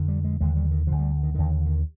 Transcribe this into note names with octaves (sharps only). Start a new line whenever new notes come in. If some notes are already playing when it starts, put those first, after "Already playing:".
Already playing: F2 D3
G3
G#3
D#2 D3 G#3
G3
D#3
D2 D3 F3
G3
D#3
D#2 D3 D#3
D#3